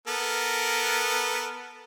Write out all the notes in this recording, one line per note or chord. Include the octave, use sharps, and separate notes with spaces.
B3 A4 A#4